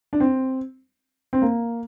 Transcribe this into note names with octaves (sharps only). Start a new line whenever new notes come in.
D4
C4
C4
A#3